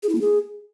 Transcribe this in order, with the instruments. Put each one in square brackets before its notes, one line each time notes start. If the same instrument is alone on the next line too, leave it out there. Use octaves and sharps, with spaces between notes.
[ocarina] G#4
E4
A#3
G#4